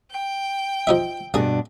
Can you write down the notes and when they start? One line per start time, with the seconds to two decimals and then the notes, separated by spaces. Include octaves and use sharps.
0.11 G5
0.87 F3 D#4 E5
1.34 G2 B2 A#3 D4 G#4